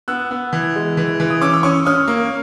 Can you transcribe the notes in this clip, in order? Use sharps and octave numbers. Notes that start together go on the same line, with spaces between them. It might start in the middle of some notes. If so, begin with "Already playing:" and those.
B3 E6 F#6
B3
E3
G#3
E3
E3
D#6
C#4 D6 E6
E6
C#4 C#6 D#6
C#4 D#6 F6
A#3